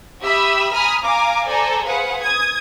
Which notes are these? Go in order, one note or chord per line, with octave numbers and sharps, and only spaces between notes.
G4 E5 B5 D#6 E6
G#5 A#5 B5 D#6 F6
F5 G#5 A#5 D6
A4 C5 D5 G#5 A#5
G#4 B4 C5 F5 F#5
D#6 G#6